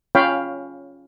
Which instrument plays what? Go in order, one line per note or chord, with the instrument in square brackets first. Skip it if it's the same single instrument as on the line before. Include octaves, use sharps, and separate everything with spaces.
[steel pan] C#4 F4 C#5 F5 G5 B5